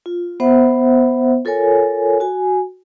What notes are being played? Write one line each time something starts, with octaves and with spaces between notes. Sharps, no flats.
F4
B3 C5 E5 F#5
F4 A4 A#4 C#5 G#5
F#4 G#5